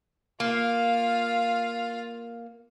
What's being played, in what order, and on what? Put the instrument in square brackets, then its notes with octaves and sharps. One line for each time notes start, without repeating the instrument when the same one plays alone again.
[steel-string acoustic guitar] A#3 [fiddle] F4 F5